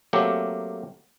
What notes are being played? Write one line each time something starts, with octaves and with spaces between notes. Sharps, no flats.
F#3 A3 A#3 C4 G4